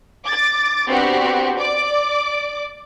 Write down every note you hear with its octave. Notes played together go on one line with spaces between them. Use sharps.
D6 A6
B3 C4 D4 F#4 G4
D5 D6